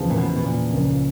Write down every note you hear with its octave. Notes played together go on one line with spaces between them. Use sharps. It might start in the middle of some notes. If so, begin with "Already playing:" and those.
Already playing: E2 C#3 F3 G#3
A#2
B2
B2
A#2
C#2 C#3 F3 A#3